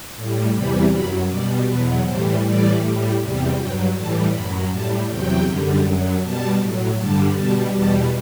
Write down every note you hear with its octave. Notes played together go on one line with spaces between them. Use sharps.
A2 G3
E2 C3 E3 G3 B5
F#2 F#3 B5
B2 G3 D5
E2 B2 F#3 B4
A2 E3 G3 C5
A2 E3 G3 D5
A2 G3
E2 C3 G3
G2 F#3 G5
A2 E3 G3 A5
F#2 F#3 B5
A2 G3 A5
E2 C3 F#3 G5
F#2 D3 G3
F#2 F#3
B2 G3 A5
A2
F#3
G2 D3 G3 A5
B2 G3 A5
E2 B2 G3 A5